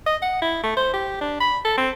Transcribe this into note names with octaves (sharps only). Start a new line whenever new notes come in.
D#5
F#5
E4
A3
C5
G4
D4
B5
A4
C4